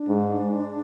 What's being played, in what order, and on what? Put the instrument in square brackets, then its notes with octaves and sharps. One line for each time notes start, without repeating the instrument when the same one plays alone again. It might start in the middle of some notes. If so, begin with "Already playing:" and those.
Already playing: [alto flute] D4
[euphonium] G#2